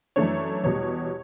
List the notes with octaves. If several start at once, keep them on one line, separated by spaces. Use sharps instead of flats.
F#2 E3 A3 D4 C#5
E2 B2 G3 C#5